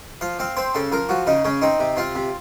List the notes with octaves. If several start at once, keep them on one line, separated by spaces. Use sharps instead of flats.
F3 F5
C4 F5
C4 C5
C#3 A4
F3 A#4
F3 F#4
C#3 D#4
C#3 C#4
C4 D#4
C3
C4 F4
C3